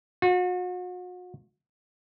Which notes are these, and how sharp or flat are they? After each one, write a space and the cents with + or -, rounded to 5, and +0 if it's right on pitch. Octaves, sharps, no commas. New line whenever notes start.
F#4 -40